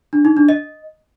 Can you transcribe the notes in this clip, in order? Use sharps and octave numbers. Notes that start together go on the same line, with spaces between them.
D4
D#4
D4
D#5